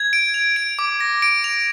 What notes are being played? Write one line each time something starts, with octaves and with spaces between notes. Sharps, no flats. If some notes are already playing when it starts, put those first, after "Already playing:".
Already playing: G#6
D7
F7
D7
D6
A#6
D7
F7